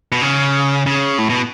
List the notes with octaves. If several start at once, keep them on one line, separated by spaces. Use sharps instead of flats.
B2
C#3
C#3
A2
B2